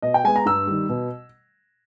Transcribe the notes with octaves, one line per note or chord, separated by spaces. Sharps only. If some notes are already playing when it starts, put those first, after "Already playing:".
B2 D#5
G5
G#3 B3 G#5
A#5
G2 E6
D#3 G3
B2